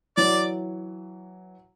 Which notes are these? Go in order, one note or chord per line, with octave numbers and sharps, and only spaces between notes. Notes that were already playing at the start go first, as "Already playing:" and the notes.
E3 F#3 D5